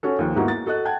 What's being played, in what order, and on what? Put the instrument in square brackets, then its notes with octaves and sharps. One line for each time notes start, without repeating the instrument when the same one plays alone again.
[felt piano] C#4 F#4 A4
D#2 F3
G#2 A#3 B3 D#4 E4 F#4
A6
F#4 A4 D#5 F#6
F#5 G5 A5 G#6